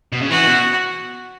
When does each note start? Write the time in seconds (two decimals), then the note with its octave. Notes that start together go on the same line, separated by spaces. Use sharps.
0.13 B2
0.21 C#3
0.30 E3 F#4
0.46 B2